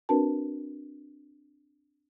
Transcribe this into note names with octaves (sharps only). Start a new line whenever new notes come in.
C4 D4 F#4 A#4 B4 A5